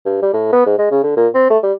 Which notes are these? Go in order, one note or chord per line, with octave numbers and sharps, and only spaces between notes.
G2
G3
A2
B3
G#2
G#3
C#3
D3
A#2
C4
A3
G3